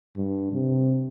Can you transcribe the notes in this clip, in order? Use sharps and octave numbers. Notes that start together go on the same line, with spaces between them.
G2
C3